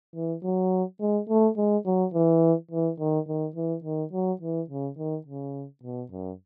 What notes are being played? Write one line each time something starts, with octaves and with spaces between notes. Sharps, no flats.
E3
F#3
G#3
A3
G#3
F#3
E3
E3
D#3
D#3
E3
D#3
F#3
E3
C#3
D#3
C#3
B2
F#2